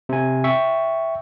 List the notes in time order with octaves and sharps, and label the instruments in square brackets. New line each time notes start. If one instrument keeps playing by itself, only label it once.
[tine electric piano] C3 G#5
E5 G5 C#6